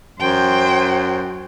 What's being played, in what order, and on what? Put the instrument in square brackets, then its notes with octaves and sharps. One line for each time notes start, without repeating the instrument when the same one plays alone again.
[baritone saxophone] F#2 [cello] C5 G5